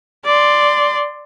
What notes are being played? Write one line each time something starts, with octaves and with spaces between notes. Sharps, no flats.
D5 C6